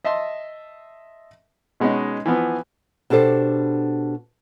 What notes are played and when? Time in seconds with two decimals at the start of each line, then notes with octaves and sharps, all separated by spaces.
0.05 D#5 E5 A5 C6
1.80 B2 G#3 B3 C#4 D#4
2.26 E3 F3 B3
3.10 B2 D4 G4 A4 C5